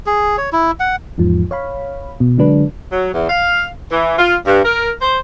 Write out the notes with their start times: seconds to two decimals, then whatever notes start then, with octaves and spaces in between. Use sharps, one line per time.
0.06 G#4
0.38 C#5
0.53 E4
0.80 F#5
1.18 E2 G#2 F3
1.51 C#5 F5 B5
2.20 B2
2.38 D3 F#3 G#3 D4 B4
2.91 F#3
3.13 E2
3.29 F5
3.90 E3
4.17 F4
4.45 G2
4.64 A#4
5.01 C5